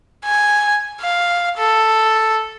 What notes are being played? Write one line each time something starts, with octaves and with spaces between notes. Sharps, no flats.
G#5
F5
A4